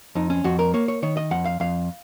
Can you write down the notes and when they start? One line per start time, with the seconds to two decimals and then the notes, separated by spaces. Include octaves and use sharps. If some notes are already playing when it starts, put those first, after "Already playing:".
0.15 F2 D#4
0.30 C#4
0.44 F2 F#4
0.59 A#4
0.74 A#3 C#5
0.88 C#5
1.03 D#3 C#5
1.17 D#5
1.31 F2 F#5
1.45 F5
1.60 F2 F5